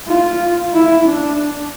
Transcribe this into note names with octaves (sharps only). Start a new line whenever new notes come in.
F4
E4
D4